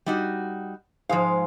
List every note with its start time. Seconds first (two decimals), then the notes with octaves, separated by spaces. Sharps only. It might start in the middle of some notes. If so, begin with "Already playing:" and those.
0.06 G3 D#4 F#4
1.09 G#2 F3 G#3 F4 F5